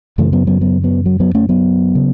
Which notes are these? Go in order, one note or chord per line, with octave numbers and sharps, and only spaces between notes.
F#2 C#3 E3 A3
F#3 B3
F#3 B3
F#3 B3
F#3 B3
F#3
F#3 B3
A3 C#4
F#3 B3
C#3